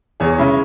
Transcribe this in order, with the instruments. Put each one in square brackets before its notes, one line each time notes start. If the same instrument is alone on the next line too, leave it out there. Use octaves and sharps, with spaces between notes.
[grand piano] E2 [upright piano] G#4 C#5
[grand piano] C#3 G#3 C#4 E4